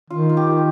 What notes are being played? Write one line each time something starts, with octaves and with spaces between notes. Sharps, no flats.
D#3 F4
F4
G4